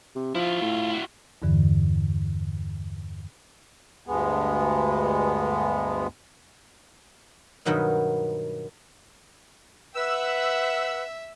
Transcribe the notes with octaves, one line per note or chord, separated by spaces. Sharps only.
C3
F3 E4 F4
A2
E4 F#4
E2 G2 D3 E3
D2 G2 G#3 B3
G2 B2 D#3 F#3 B3 D#4
B4 E5 F#5 E6